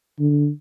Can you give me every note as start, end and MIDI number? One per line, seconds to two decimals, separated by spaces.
0.19 0.49 50